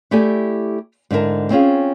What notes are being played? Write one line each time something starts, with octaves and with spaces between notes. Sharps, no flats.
A3 E4 G4 A4 D5 G#5
G#2 D3 E4 A#4 A5
C4 C#4 F4 G#4